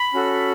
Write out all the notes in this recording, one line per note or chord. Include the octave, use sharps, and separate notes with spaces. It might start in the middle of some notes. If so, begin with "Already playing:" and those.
Already playing: B5
C#4 F#4 A4